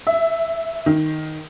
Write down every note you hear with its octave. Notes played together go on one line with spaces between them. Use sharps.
E5
D#3